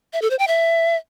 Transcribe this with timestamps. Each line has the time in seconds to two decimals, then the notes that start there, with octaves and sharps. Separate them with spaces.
0.13 E5
0.22 A4
0.30 C5
0.39 G5
0.48 E5